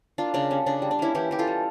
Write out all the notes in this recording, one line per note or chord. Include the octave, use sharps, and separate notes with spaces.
A#3 D4 F4
C#3 D4
G3 C#4
C#3 D4
G3
D4
A#3 C#4 E4
E3 E4 G4
E3 G4
F4 A4
G3